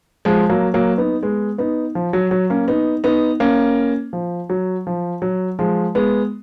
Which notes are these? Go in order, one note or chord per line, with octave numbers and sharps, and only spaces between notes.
F3 G#3
F#3 A#3
F#3 A#3
B3 D#4
G#3 B3
B3 D#4
F3
F#3
F#3
A#3 C#4
B3 D#4
B3 D#4
A#3 C#4
F3
F#3
F3
F#3
F3 G#3
G#3 B3